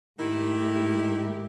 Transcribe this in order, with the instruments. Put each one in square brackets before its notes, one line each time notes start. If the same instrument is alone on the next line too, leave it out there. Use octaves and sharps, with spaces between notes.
[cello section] G#2 A3 G4 [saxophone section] D#3 E4